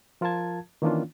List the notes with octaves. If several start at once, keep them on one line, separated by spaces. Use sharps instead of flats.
F3 F4 A#4 F5 A5 G#6
D#3 E3 A#3 C#4 D4 F4